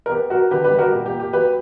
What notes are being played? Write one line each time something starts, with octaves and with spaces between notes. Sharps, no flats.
A#4
B3 G4
F#3 F#4 A#4
D3 G4 B4
G4 B4
G3
F#4 A#4
A#2 G4
G4
A#3
G4
F#3 G4 B4